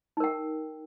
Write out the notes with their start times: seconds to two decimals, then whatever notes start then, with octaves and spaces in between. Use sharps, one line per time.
0.17 D#4
0.20 A#4
0.24 G5